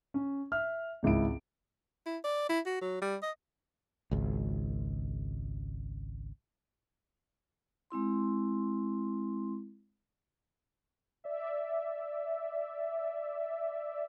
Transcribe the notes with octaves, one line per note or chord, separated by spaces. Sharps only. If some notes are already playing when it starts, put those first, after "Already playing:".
C#4
E5 F6
G#1 C#2 E4 D7
E4
D5
E4
F#4
F#3
G3
D#5
G#1 C#2
G#3 C4 E4 C6
D5 E5